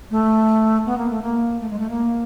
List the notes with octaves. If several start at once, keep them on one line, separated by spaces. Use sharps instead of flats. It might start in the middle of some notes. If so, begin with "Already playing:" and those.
A3
B3
A#3
A3
A#3
A3
G#3
A3
A#3